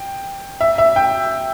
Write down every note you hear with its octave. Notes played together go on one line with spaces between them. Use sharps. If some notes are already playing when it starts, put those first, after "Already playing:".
Already playing: G5
E5
E5
G5